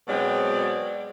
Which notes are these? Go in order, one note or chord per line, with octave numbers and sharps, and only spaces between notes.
B2 F#3 G#3 C4 D5